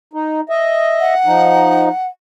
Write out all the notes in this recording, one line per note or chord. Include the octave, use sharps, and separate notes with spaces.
D#4
D#5 E5
F#5
F3 D#4